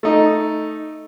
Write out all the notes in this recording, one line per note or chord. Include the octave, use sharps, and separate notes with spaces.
A3 D#4